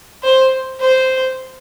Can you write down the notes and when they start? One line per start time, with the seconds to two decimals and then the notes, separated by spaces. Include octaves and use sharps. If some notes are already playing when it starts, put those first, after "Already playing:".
0.23 C5
0.81 C5